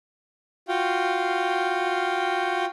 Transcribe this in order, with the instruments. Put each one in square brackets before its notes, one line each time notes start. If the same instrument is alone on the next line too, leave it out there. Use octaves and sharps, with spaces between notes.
[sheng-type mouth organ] F4 F#4 F5 G5